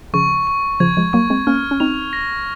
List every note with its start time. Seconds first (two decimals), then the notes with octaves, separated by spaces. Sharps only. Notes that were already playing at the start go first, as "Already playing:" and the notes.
0.13 C#3 F3 C#6
0.47 C#6
0.80 C#3 F3 G#6
0.97 F3 G#3
1.13 F#3 A#3 C#6
1.30 G#3 C4
1.47 A#3 C#4 F6
1.71 C#4
1.80 C4 D#4 F7
2.13 A#6